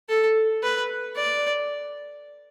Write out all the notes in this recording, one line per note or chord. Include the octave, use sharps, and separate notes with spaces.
A4
B4
D5